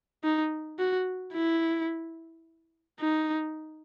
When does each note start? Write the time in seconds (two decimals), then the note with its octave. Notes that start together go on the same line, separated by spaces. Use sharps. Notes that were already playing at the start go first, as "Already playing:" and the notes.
0.24 D#4
0.79 F#4
1.34 E4
3.00 D#4